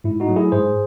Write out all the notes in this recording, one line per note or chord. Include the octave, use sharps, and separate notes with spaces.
G#2 E4
D#4 F#4
F#3 A3
E4 G#4
G#2 G#4 C5